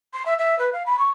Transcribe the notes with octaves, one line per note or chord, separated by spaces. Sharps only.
C6
E5
E5
B4
F5
B5
C#6